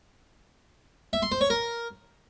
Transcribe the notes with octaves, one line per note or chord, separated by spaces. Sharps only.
E5
C6
C5
C#5
A#4